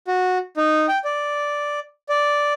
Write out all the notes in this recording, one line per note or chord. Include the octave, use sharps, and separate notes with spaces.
F#4
D#4
G5
D5
D5